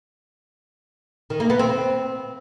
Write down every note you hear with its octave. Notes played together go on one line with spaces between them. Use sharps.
D#3
A#3
B3
C4